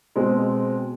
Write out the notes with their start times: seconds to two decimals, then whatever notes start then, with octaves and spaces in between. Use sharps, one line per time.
0.16 B2 G#3 C4